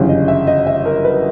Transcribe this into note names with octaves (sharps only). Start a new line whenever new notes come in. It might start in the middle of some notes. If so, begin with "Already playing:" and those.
Already playing: G1 F#2 C#3 E3 G3
D#5
E5
D#5
E5
A#4
B4